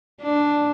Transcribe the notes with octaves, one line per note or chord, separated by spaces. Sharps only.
D4